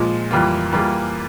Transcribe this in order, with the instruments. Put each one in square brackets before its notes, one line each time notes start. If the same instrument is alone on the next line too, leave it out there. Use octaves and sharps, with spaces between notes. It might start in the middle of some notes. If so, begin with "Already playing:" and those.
Already playing: [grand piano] A#2 F3 G#3
F2 E3 G3 A#3 F4
E3 G3 A#3 F4 G#4